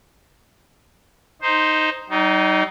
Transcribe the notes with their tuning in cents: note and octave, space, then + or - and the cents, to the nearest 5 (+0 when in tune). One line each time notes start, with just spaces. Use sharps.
D#4 +0 C5 +0
G3 -45 D#4 +0